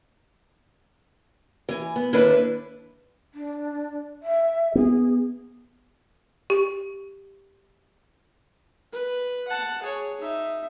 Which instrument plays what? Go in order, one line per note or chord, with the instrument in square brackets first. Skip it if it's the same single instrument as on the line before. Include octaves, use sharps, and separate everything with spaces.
[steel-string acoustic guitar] E3 G#5
B3
D#2 D3 D4 E4 B4
[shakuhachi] D4
E5
[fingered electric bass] B3 [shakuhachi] G#4
[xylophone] G4
[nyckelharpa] B4
F#5 A5
G#4 C#5
D#4 E5